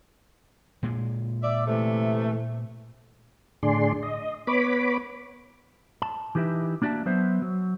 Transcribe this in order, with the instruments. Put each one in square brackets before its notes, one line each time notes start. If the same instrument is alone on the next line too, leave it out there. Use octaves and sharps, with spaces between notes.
[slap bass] A#2 G#3
[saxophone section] D5 E5
C3 E3 A3
[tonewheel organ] A2 D3 D4 G#4 D5 C6
D#5
B3 B4 C#5 B5 D6
[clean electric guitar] A5
E3 D#4 G4 B4 E5
A#3 D4 F#4 D5 E5 A5
F#3 B3 C5 E5
F#3